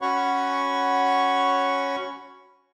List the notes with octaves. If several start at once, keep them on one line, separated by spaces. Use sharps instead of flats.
C#4 F#4 C#5 F#5 B5 C#6